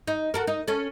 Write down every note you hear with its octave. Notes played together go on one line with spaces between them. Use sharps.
D#4
F#4 A4 A#4
D#4
C#4 A4